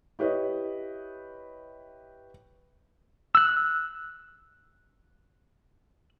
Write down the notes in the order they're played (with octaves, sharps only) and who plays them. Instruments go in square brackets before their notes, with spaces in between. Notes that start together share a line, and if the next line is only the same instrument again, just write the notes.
[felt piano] E4 G4 B4 C#5 D#5
[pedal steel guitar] E6 F#6